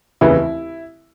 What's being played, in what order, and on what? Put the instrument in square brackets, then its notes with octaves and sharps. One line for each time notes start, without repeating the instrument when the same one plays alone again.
[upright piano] F1 D#2 C#3 E3 E4